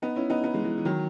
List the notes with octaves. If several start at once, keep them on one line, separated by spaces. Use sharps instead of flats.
B3 D#4
C#4 E4
B3 D#4
B3 D#4
E3 G#3
E3 G#3
E3
D#3 F#3